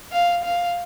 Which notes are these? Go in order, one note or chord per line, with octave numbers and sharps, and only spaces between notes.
F5
F5